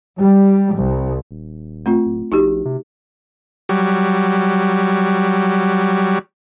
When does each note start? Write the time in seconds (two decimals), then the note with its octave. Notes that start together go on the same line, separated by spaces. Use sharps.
0.20 G3
0.77 C2
1.31 D#1
1.86 A3 C4 F4
2.05 D1
2.32 A#1 D#4 F#4 G4
2.65 C3
3.69 F#3 G3